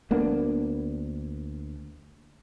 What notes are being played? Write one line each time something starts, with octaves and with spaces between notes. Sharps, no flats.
D2 A#3 B3 D4